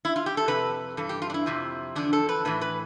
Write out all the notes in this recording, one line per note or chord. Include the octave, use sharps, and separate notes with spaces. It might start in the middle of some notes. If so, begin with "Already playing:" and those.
E4
F4
G4
A4
F2 C3 B4
G2 E3 A4
G4
F4
D4
E4
F2 C3 F3
E2 D3 F3 D4
A4
B4
A2 E3 B4
B4